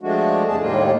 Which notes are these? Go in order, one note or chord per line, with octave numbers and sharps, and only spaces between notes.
F3 G#3 A3 D4 F#4
E2 C3 A3 G#4 A5
D#2 A2 G3 G#3 A#3 F4